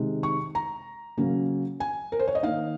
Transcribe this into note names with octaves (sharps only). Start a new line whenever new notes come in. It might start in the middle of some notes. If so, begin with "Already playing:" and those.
Already playing: C3 D#3 G#3
C#6
A#5
C#3 F#3 A#3 C#4
G#5
A#4
C5
C#5
D#5
D#3 A#3 D#4 F5